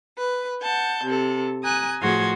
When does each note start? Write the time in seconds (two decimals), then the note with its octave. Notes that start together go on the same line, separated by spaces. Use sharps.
0.17 B4
0.61 F#5 A5 G6
1.05 C3 A4
1.64 G#5 A#5 D#6 F#6
2.01 A2 F3 F#4 G#4 C6 G#6